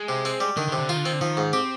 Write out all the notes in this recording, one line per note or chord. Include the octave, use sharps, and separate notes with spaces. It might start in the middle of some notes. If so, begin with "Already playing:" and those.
Already playing: G#3
C3
C4
G3
D3 D#3
D3
C3
D3
D#3 F4
D3
D#3 C4
D3
D#3 F3
G#2
C4 G4